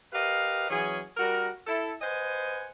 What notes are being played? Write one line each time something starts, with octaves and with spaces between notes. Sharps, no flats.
G4 A#4 B4 D#5 F5
E3 F#3 C#4 G#4
G3 F#4 A#4
E4 A4
B4 C5 D#5 F#5 G#5